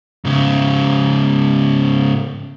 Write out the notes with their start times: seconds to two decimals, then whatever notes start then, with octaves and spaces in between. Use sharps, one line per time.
0.25 G#2 C#3